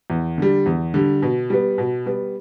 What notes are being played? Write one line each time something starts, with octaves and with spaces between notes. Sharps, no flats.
E2
D3 G3
E2
D3 G3
B2
G3 B3
B2
G3 B3